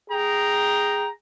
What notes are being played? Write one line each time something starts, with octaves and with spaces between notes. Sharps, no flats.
G#4 G5 A#5